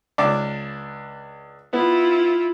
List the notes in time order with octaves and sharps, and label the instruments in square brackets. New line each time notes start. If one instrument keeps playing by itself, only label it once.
[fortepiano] C#2 D4 D6
[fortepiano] B3 [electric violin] E4 F4